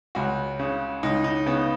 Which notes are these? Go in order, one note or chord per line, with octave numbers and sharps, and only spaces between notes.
C#2 F#4
C#3
C#2 D#4
D#4
C#3 B3